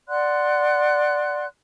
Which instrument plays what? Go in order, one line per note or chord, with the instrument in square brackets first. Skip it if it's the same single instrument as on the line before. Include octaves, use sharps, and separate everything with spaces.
[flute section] D5 F#5 C6 F#6